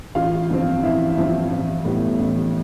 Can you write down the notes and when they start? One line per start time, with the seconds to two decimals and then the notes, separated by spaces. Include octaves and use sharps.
0.15 A1 F4 F5
0.50 G2 F3 C4
0.83 A1 E4 E5
1.17 G2 F3 C4
1.51 A1
1.85 A2 G3 B3
2.19 A1